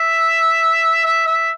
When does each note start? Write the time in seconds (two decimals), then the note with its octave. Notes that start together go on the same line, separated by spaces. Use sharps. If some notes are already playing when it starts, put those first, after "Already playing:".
Already playing: E5
1.05 E5
1.27 E5